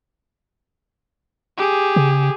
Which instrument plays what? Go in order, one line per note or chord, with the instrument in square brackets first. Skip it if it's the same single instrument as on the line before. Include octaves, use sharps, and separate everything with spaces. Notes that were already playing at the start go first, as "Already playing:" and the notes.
[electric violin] G4 G#4
[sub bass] C#3